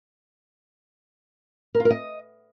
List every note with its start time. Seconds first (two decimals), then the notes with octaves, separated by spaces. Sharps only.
1.75 A#4
1.80 F4
1.85 A#4
1.90 D#5